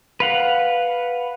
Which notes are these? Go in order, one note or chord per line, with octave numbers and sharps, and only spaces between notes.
B4 F5 F#5